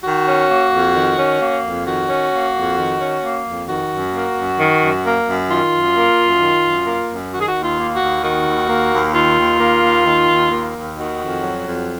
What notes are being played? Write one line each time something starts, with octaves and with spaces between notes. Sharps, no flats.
D#3 F#4
C#4
A#3
F2
D#3
C#4
A#3
F2
D#3 F#4
C#4
A#3
F2
D#3
C#4
A#3
F2
D#3 F#4
F#2
A#3
F#2
D#3
F#2
A#3
F#2
D#3 F4
F#2
A#3
F#2
D#3
F#2
A#3
F#2
D#3 F#4
G#4
F#4
D#2
F4
A#3
F#4
D#2
D#3 F#4
D#2
A#3
D#2
D#3 F4
D#2
A#3
D#2
D#3
D#2
A#3
D#2
D#3 F#4
F2
F#3
F2